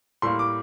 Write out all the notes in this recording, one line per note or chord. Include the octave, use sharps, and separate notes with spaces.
A2 G3 A#3 C6
D6